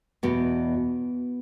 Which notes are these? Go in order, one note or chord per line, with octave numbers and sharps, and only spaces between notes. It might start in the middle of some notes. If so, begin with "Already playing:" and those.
E2 B2 B3